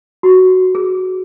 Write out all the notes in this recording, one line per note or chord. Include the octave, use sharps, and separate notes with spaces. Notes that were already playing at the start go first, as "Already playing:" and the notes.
F#4
G#4